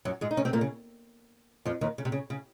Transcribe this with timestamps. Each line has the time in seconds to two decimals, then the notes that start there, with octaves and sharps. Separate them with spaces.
0.05 F#2 F#3
0.21 G#2 G#3
0.31 D#4
0.37 C#3 C#4
0.45 C3 C4
0.53 A#2 A#3
0.61 C#3
1.65 F2 F3
1.81 D#2 D#3
1.98 C#3
2.05 C3
2.12 C#3
2.30 C#3